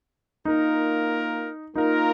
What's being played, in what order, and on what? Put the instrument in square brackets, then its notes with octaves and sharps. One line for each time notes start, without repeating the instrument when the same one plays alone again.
[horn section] A#3 F4 A#4 [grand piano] D#4
[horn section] A#3 F4 A#4 [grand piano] D#4